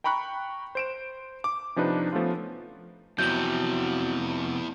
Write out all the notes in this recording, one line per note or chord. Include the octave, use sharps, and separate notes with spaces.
G5 A#5 B5 C#6 F#6
C5 D7 E7
D6
C3 F3 D4 D#4 B4
F3 A3 B3 C#4 F4
F2 C3 F#3 B3 E4 G6 G7